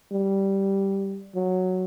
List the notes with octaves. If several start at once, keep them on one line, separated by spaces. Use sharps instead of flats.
G3
F#3